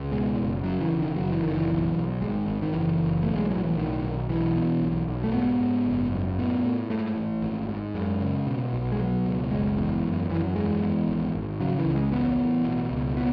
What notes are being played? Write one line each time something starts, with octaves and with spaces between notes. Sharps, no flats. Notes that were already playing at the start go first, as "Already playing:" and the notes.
Already playing: C#2
B2 G#3
F#1
C#3 F#3
E3
E1
D#3
F#1 F#3
E3
F#1 D#3
E3
B1
B1
G#1 G#3
G#1
D#3
F#1 E3
F#1
B1 A3
G#3
A2 F#3
E3
B1 D#3
B1
B1 E3
B2
B1
B1
A3
G#2 B3
G#2
F#1
F#2
A2 B3
A2
G#2 A3
A1
G#1
G#2
F#2 G#3
C#3
B2
B1
G#3
B2 F#3
C#2
F#1 G#3
E2
F#2
F#2 E3
F#3
E2 G#3
E2
G#1
G#1
C#3 F#3
E3
C#2
G#3
A1 B3
A1
B2
C#2
B3